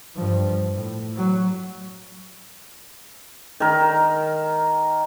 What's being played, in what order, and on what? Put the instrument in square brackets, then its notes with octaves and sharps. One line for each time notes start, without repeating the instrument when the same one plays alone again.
[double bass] G2 F3
A2
F#3
[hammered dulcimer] D#3 A#4